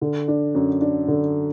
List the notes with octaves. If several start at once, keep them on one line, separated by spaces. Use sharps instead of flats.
D3
D4
F#2
D4
D3